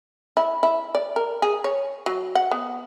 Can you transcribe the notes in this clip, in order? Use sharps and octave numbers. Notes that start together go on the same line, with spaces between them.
E4
E4
D5
A#4
G#4
C#5
F#3
F#5
B3